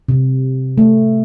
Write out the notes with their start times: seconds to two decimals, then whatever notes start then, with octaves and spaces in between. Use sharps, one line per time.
0.09 C3
0.78 A3